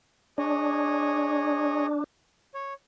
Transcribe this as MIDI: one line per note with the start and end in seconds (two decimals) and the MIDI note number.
0.38 2.04 62
0.38 1.86 68
0.38 1.86 73
0.38 1.86 75
2.54 2.74 73